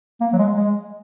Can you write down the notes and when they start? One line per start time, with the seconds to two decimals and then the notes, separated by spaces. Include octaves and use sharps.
0.21 A#3
0.33 F#3
0.38 G#3
0.56 G#3